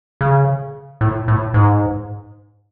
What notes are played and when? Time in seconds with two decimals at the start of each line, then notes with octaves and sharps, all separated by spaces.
0.21 C#3
1.01 A2
1.28 A2
1.54 G#2